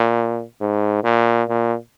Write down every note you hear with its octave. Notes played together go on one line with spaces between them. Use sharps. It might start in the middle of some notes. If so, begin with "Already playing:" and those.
Already playing: A#2
G#2
A#2
A#2